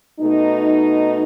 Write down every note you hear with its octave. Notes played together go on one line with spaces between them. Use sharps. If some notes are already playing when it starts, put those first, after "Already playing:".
B2 A3 D#4